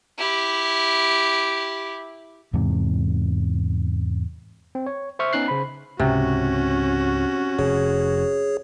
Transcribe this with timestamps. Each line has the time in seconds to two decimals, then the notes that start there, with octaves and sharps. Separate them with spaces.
0.18 E4 G4
2.53 E2 G#2 C3
4.75 C4
4.86 C#5
5.19 C5 E5 C#6 F6
5.33 B3 C#4 D#4 F#6 C7
5.48 C#3 C5 B5
5.99 C#2 G#2 C3 C#4 F#4
7.59 F1 G#4 C#5